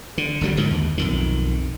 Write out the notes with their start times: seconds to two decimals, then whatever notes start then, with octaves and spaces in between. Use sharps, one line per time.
0.18 D3
0.41 G1 D3 F#3 G3
0.57 G#2 D3 D#3 F3
0.71 D#2
0.98 B1 F2 D#3